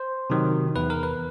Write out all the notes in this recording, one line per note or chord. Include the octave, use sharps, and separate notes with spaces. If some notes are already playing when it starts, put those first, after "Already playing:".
Already playing: C5
C3 D#3 F#3
E2 B4
A#4
B4